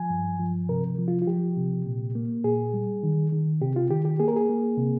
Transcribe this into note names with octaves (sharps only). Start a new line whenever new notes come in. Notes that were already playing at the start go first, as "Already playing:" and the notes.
Already playing: F3 G#5
G2
F3
C3 A#4
F3
F4
F4
F3 G4
C3
A#2
A#3
A#2 G#4
G3
D#3
D#3
C3 G4
F4
D#3 G4
G4
A#3 G#4
A#4
G#4
A#3
C3